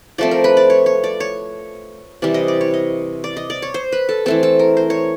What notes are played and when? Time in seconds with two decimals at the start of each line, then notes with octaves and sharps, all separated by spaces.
0.18 F3 A3 C4 D5
0.31 A#4
0.44 B4
0.57 D5
0.70 C#5
0.86 C#5
1.04 D5
1.20 C#5
2.22 C3 E3 G3 D5
2.34 D#5
2.48 D5
2.61 C#5
2.74 D#5
3.24 D5
3.37 D#5
3.50 D5
3.62 C#5
3.74 C5
3.92 B4
4.09 A4
4.26 E3 A3 C4 A4
4.43 A4
4.59 A#4
4.77 C5
4.90 C#5